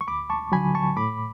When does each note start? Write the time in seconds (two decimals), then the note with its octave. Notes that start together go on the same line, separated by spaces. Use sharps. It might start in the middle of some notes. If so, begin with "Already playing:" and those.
0.01 C#6
0.07 D2 B5 D6
0.30 A5 C#6
0.52 D3 F#3 G#5 B5
0.75 A5 C#6
0.97 A2 B5 D6